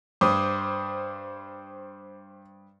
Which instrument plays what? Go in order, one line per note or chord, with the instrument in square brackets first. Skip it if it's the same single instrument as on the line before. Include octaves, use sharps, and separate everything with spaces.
[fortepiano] G2 [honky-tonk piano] C5 [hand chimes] D6 [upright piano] D#6